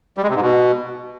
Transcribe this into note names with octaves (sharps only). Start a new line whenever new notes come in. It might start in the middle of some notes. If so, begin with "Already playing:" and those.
G3
G#3
C3
G#2
B2